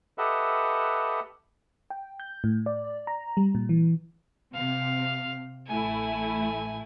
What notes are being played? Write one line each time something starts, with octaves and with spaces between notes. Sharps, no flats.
G4 A4 B4 D#5 E5 F#5
G5
G6
A2
D5
A#5
G3
A#2
E3
C3 F5
A1 A3 E4 G#5